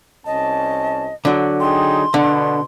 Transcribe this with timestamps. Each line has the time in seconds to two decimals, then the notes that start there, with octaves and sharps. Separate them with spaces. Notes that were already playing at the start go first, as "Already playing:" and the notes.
0.26 C2 C#4 D#5 A5
1.25 D3 F#3
1.60 D#4 G#4 G5 C6
2.14 B2 D3 D4